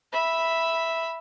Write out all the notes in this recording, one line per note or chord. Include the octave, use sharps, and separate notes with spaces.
E5 B5